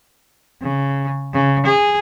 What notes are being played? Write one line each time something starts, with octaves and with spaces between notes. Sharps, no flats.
C#3
C#3
G#4